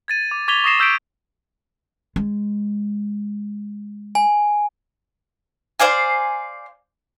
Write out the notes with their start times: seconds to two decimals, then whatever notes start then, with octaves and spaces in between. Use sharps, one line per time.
0.08 G#6 A6 D#7
0.31 D6
0.48 C#6 D6 G#6 B6 F7 G7
0.64 C#6 D#6 A#6 C7 E7
0.80 E6 G6 B6 D7
2.16 G#3
4.15 G#5
5.79 C5 D5 F5 G#5